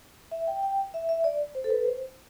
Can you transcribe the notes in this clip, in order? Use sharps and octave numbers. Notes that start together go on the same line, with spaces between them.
E5
G5
G5
E5
E5
D5
C5
A4
B4
C5